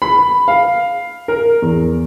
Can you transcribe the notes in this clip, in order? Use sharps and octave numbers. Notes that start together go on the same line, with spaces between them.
B5
F5
A#4
E2